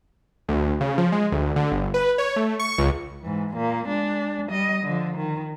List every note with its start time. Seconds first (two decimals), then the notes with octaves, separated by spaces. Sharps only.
0.49 D2
0.81 C#3
0.98 F3
1.12 G#3
1.32 D2
1.56 D3
1.71 G1
1.94 B4
2.18 C#5
2.36 A3
2.59 C#6
2.78 C#2
3.21 G#2 E3
3.56 A#2 A#3
3.88 G#3 D4
4.50 G3 D#5
4.84 D3 F3
5.17 D#3